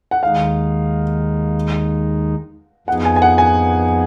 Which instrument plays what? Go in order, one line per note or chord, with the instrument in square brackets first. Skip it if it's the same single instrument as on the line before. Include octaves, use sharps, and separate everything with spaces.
[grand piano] F#5
[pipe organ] D#2 D#3 G#3 D#4 [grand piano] F5
[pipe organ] F2 F3 B3 D#4 G#4 [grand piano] F#5
[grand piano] G#5
G#5
F#5
G#5